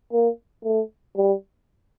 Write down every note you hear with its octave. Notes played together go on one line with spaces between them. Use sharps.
A#3
A3
G3